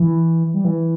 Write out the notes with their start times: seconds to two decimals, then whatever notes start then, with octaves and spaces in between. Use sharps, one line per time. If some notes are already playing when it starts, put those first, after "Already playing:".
Already playing: E3
0.54 G3
0.65 E3